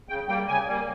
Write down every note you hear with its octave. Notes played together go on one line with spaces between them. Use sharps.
C#3 G5
G3 A#3 G5
C#3 G#5
G3 A#3